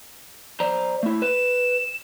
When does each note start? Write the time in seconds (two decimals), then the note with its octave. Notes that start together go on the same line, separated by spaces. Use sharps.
0.60 C5 D5 A#5
1.03 A3 E4
1.22 B4 E7